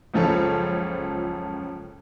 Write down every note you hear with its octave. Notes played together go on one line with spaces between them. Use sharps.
F#1 C#2 F3 C#4 A4